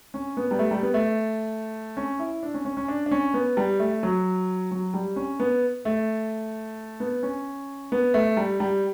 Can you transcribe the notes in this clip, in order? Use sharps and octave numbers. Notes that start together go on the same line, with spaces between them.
C#4
B3
G3
A3
G3
B3
A3
C#4
E4
D4
C#4
C#4
C#4
D4
D4
C#4
B3
G3
A3
F#3
F#3
G3
C#4
B3
A3
B3
C#4
B3
A3
G3
G3